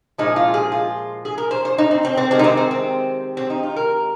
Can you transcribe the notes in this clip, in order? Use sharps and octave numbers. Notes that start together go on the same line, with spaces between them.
A#2 F3 G#3 D#4
F4
G#4
F4
G#4
A#4
C5
C5
D#4
C4
C4
C4
C3 D#3 G#3 C4
D#4
C4
C4
C4
C4
D#4
F4
A#4